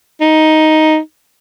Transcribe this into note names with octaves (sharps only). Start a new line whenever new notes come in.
D#4